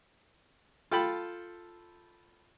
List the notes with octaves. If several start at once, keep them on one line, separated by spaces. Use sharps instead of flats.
F4 A4 G5 A5 B5